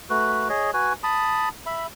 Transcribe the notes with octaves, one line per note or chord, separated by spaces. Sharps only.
A3 F#4 B4
G#4 C#5 D#5
F#4 B4 G#5
A5 B5 D#6
E5 B5